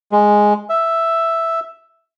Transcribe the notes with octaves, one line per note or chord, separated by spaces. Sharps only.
G#3
E5